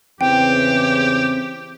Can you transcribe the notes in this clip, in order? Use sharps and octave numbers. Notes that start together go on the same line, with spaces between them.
E2 C#3 E3 C4 G4 G5